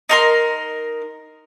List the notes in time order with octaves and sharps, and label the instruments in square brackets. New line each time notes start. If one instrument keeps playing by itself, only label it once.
[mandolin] D#4 A#4 C6